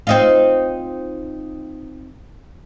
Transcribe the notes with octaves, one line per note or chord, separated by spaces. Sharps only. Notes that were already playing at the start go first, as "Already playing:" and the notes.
C4 D#4 F4